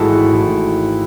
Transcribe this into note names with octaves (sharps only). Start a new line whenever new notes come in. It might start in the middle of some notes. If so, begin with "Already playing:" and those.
Already playing: G#1 G#2 E3 A3 E4 F#4 G#4 A4
F#4
G#1 G#2 E3 A3 E4